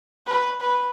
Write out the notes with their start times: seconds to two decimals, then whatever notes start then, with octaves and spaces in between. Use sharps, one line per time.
0.27 B4
0.61 B4